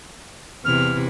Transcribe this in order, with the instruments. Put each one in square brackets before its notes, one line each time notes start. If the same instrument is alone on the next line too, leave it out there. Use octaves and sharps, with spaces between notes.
[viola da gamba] E2 C3 E4 [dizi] F6